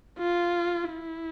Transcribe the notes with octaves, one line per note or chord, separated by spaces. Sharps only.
F4
E4